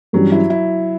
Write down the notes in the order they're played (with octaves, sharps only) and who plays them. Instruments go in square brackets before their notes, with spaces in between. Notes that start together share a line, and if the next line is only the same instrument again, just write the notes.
[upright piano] G2 E3 G3 C#4 [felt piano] F#3
[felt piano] E4
E4